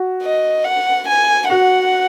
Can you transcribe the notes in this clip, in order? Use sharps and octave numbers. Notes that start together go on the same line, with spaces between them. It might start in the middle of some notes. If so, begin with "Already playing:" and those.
Already playing: F#4
D#5
F#5
G#5
F#4 F#5